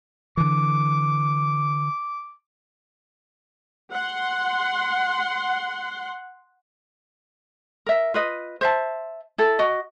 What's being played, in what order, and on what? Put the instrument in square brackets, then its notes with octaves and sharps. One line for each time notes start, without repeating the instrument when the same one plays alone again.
[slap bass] D3 E3 [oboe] D6
[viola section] F#5 C6
[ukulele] A#4 E5
F4 B4 D#5
C5 E5 A5
E4 A4
F#4 D#5